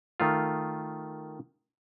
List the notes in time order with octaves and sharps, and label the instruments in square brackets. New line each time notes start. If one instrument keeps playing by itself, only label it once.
[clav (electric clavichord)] D#3 A3 F4